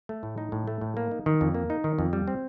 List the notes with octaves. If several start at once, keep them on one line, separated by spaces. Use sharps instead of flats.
A3
A2
D#4
A2
A3
A2
A#3
D#4
D#3
F2
A#3
D#4
D#3
F2
G3
C4